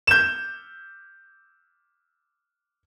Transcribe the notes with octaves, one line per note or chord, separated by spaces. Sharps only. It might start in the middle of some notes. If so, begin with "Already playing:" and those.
G6 E7